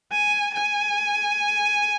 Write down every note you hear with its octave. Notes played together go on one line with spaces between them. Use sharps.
G#5
G#5